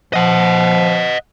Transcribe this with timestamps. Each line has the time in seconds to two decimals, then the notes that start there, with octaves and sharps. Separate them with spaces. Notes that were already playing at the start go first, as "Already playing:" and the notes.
0.13 F3 D#5 F#5